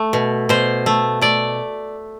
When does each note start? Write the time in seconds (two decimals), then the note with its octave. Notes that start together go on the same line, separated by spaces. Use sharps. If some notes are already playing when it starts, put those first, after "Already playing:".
Already playing: A3
0.13 B2
0.49 B2 C5
0.86 A3
1.21 A3 D5